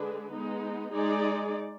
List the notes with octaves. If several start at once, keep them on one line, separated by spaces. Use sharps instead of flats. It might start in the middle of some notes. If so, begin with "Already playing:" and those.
Already playing: D3 G#3 D4 G#4 B4
G#3 B3 D#4
G#3 D#4 G#4 D5